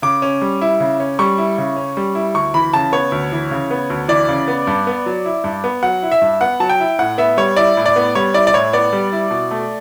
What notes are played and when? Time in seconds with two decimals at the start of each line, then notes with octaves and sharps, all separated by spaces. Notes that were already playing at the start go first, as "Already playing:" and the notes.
0.02 C#3 D6
0.22 C#4
0.42 G3
0.61 E4
0.80 C#3
1.00 C#4
1.19 G3 C#6
1.38 E4
1.58 C#3
1.76 C#4
1.97 G3
2.15 E4
2.34 D2 C#6
2.54 E3 B5
2.73 C#3 A5
2.92 B3 C#5
3.12 D2
3.32 E3
3.51 C#3
3.71 B3
3.90 D2
4.08 E3 D5
4.29 C#3
4.48 B3
4.67 G2
4.87 B3
5.06 F#3
5.25 E4
5.44 G2
5.64 B3
5.83 F#3 F#5
6.03 E4
6.12 E5
6.22 G2
6.41 B3 F#5
6.60 F#3 A5
6.69 G5
6.80 E4
6.99 A2 F#5
7.18 B3 E5
7.37 G3 C#5
7.57 E4 D5
7.77 A2
7.86 D5
7.96 B3
8.15 G3 C#5
8.34 E4 D5
8.47 D5
8.54 A2 C#5
8.73 B3 D5
8.93 G3
9.12 E4
9.31 B2
9.51 A3